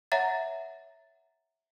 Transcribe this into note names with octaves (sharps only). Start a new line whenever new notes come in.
C#5 E5 F#5 A#5 A6